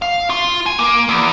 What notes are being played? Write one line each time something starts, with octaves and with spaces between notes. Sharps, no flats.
F5
F4
G#5
A#3
E2